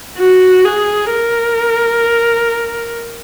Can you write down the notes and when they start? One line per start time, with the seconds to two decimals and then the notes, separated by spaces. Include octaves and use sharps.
0.18 F#4
0.65 G#4
1.11 A#4